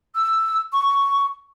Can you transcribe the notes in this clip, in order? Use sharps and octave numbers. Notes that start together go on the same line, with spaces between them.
E6
C#6